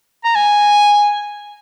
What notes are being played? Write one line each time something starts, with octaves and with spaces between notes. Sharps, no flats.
A#5
G#5